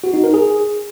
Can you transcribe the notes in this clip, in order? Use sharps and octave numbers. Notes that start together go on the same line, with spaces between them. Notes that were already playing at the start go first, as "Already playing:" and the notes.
F#4
D#4
A#4
G#4